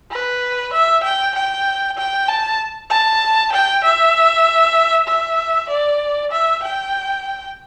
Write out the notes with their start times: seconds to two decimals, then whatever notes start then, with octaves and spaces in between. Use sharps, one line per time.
0.11 B4
0.73 E5
1.04 G5
1.35 G5
1.98 G5
2.28 A5
2.90 A5
3.52 G5
3.84 E5
5.08 E5
5.69 D5
6.31 E5
6.63 G5